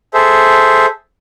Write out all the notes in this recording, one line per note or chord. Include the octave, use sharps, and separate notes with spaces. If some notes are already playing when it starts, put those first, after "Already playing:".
G#4 A4 C5 E5